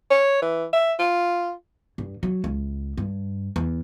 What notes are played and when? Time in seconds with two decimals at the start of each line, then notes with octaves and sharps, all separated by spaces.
0.11 C#5
0.42 E3
0.73 E5
0.99 F4
1.98 G2
2.23 F#3
2.44 C#2
2.97 G2
3.56 E2